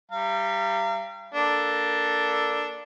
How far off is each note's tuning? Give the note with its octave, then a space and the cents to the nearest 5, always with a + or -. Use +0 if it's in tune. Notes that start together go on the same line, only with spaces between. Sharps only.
G3 +0 F5 -40 A#5 -25
A#3 +10 D4 +0 A4 +0